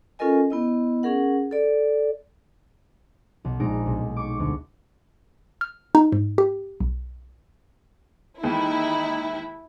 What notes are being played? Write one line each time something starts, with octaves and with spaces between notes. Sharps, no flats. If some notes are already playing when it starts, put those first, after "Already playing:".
C#4 F4 A4 A#4 D#5 G#5
B3 E4 D#5
C#4 G#4 A#4 F#5
A4 D5
B1
A#1 G#3 D#4 A#5 D7
B1
C#6 D6
D2 C#6
F6
D#4
G#2
G4
B1
D#2 E3 G#3 D#4 E4